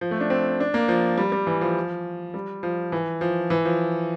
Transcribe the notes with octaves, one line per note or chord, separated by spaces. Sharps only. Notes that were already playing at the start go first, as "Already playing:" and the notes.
F3
A3
D4
C4
D4
A#3
F3
G3
G3
E3
F3
G3
F3
E3
F3
E3
F3